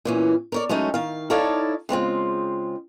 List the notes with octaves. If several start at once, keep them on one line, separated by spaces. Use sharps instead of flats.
A#2 E3 C#4
A#4 C#5 D5
F#3 G#3 A3 C#4 D#4
D#3 F5
D#4 E4 A4 C#5 D5 F5
C#3 G#3 C4 F4